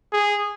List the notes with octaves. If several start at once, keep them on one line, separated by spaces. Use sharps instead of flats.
G#4